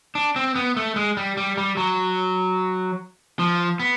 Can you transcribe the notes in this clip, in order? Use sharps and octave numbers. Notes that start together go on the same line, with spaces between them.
D4
C4
B3
A3
G#3
G3
G3
G3
F#3
F3
B3